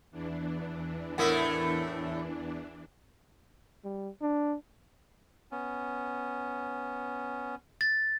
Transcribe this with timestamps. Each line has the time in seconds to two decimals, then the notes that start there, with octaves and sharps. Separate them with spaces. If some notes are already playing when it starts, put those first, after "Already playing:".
0.11 E2 E3 D4
1.18 A2 A3 E4 A#4 F#5
3.84 G3
4.22 D4
5.51 B3 C#4
7.81 A6